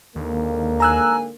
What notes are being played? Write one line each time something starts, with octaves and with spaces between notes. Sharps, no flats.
D#2 G#2 D3 A#3
G#5 A#5 E6 F#6